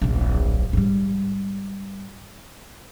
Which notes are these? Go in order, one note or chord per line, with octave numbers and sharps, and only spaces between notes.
D1 A#1
G#2 G3